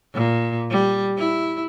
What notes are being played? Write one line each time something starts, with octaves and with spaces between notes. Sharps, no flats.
A#2
G3
E4